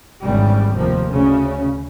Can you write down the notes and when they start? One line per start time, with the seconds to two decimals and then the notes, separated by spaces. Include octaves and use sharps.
0.22 G#1 E2 C#3 G3
0.75 F1 D#2 C3 F3 A#3
1.08 D2 C#3 C#4